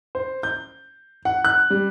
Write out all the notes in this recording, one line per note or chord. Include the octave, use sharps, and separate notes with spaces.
C5
G6
F#5
F#6
G3